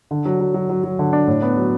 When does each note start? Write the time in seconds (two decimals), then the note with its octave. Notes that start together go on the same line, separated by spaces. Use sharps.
0.11 D3
0.25 F#3
0.40 F#3
0.54 F#3
0.69 F#3
0.84 F#3
0.99 D3
1.13 D4
1.27 A2
1.42 B3
1.57 F#3